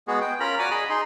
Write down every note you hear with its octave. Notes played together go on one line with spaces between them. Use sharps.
G#3 B3 F#4 G#4
G5
C#4 F4 A#4 A#5 B5
F#4 D5 F#5 G#5 A#5 D6
G#4 D#5 B5 D#6
D#4 G#4 C6